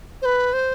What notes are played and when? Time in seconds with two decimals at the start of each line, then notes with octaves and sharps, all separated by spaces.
0.22 C5
0.25 B4
0.53 C5